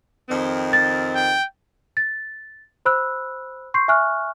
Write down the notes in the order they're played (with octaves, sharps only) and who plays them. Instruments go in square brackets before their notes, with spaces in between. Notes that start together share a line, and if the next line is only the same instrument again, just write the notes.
[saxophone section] F2 D#3 C4
[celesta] A6
[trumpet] G5
[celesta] A6
C5 B5 E6 F#6
C6 C#6 G6 C7
E5 G#5 C#6 F6 F#6